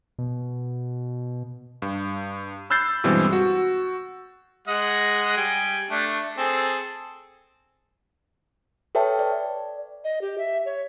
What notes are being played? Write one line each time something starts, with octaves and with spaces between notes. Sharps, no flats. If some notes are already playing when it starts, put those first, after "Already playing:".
B2
G2
B5 E6 F#6 G6 A6 C7
G2 B2 E3 G3 G#3 C4
F#4
G#3 D#5 F#5
G3 G5 G#5
A3 D4
C4 G#4 A4
A4 B4 C#5 E5 G5 A5
D5
D#5
G4
E5
C#5